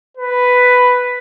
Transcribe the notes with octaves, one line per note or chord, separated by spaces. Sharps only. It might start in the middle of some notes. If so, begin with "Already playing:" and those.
B4